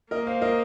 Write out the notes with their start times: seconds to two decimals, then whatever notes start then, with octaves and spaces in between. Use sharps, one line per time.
0.11 A#3 A#4 D#5
0.27 C5 F5
0.42 A#4 D#5